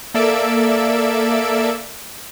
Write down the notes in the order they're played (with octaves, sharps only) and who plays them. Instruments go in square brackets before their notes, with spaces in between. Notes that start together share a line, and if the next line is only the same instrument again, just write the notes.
[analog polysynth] A#3 A4 D5 E5 E6 D7